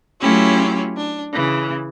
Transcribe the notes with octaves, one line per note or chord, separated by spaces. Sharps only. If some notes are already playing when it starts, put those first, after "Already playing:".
F#3 A3 C#4 E4 F4 G4
D4
C#3 E3